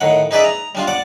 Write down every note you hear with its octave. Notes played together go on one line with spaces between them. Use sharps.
A2 D#3 F#5
D#4 G#4 B4 D5 E5
A#5
G3 D4 F4
D5 F#5 A5